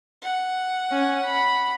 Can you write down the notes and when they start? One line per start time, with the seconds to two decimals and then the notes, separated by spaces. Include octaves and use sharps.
0.22 F#5
0.91 C#4
1.25 B5